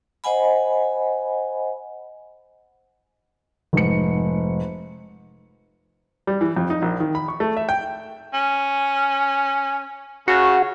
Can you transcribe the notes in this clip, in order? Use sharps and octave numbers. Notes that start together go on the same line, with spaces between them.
C5 D#5 F#5 G#5 B5
F1 G#2 C#7
G3
E3
F2
D#4
A#1
D#3
B5
C#6
A3
E5
G5
C#4
C#3 F#4